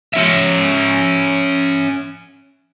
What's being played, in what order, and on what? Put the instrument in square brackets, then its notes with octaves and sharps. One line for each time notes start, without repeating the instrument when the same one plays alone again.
[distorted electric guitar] C#4 E5